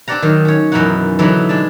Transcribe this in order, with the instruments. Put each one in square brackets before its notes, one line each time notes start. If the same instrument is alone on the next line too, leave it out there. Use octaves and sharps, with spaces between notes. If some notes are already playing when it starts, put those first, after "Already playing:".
[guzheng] C4 D4 G4 D5 F#5 A#5
D#3 F#3
C#4 C#5
F#2 B2 E3 C#4 D#4 F#5
D3 E3 F#3 B3 D4 D#4
G#3 D4 A5